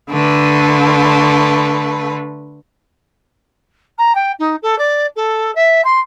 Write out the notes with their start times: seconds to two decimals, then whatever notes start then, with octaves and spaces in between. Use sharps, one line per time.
0.10 D3 A3 B4
3.98 A#5
4.15 G5
4.39 D#4
4.62 A4
4.78 D5
5.16 A4
5.55 E5
5.84 C6